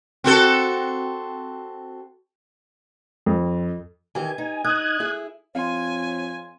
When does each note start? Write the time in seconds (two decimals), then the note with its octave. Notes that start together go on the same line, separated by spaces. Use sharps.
0.24 C4 F#4 A4
3.26 F2
4.15 D#3 E3 G4 G#5
4.38 D#4
4.64 D#4 D#6 F#6 G#6
5.00 E4 G#4
5.55 F2 C#5 F5 G#5 C6